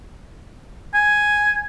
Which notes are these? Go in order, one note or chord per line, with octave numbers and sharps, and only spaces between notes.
G#5